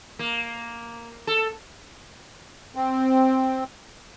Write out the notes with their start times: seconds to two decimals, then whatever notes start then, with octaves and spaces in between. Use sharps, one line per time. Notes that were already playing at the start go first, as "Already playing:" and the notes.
0.19 A#3
1.27 A4
2.75 C4